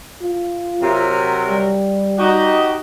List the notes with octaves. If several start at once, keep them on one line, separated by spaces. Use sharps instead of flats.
F4
C3 F#3 A#4
G3
D#4 F#4 G4